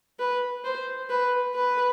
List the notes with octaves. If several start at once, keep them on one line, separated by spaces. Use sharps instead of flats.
B4
C5
B4
B4